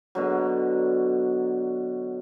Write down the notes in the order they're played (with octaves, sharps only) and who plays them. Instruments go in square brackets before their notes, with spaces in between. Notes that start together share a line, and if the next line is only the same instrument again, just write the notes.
[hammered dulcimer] B2 D3 F#3